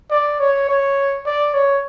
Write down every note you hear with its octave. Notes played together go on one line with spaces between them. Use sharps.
D5
C#5
C#5
D5
C#5